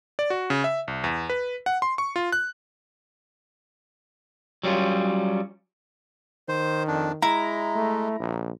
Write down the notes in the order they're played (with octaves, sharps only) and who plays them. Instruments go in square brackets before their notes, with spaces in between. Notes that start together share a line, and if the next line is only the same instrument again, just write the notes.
[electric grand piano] D5
F#4
C#3
E5
C2
E2
B4
F#5
C6
C#6
F4
F#6
[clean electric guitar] F#3 G3 C#4 F4
[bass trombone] D#3 [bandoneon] C5
[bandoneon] F2 D4
[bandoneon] G#3 [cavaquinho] E4 [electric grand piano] A#5
[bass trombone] A3
A#1